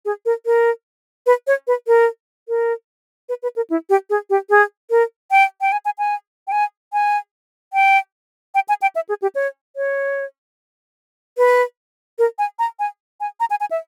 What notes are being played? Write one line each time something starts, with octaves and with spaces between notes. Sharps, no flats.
G#4
A#4
A#4
B4
C#5
B4
A#4
A#4
B4
B4
A#4
E4
G4
G#4
G4
G#4
A#4
G5
G5
G#5
G#5
G#5
G5
G#5
G#5
G5
G5
G#5
G5
E5
G#4
G4
C#5
C#5
B4
A#4
G#5
A#5
G#5
G#5
A#5
G#5
G#5
E5